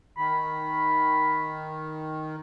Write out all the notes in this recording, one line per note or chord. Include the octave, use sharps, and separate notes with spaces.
D#3 B5